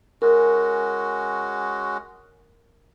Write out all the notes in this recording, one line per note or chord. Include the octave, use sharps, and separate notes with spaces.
G#3 C#4 F#4 A#4